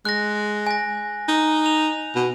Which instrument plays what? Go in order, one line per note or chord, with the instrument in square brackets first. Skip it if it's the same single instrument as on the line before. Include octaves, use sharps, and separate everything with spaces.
[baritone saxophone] G#3 [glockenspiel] F#6 A#6
[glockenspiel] G#5 A#6
[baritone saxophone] D#4
[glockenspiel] F7
[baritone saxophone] B2